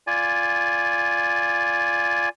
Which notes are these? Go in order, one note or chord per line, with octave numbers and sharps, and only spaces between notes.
F4 D5 G#5